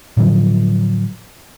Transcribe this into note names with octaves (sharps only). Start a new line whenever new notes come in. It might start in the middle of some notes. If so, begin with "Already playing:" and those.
A2 D3 F3 F#3